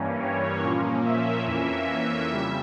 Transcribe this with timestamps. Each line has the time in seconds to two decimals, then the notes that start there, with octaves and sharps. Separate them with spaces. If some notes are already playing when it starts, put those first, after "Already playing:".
Already playing: G2 E3 G3 A#3 C#4
0.21 C#5
0.63 A#2 F3 A#3 C#4
1.05 E5
1.46 F2 E3 A#3 C#4 E5
2.30 F2 C#3 G3